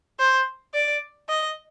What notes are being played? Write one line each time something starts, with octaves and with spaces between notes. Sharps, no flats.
C5
D5
D#5